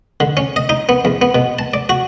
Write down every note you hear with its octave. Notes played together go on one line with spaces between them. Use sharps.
D3
C#4
D#5
D#4
B3
E2
B3
B2
A5
D5
F#4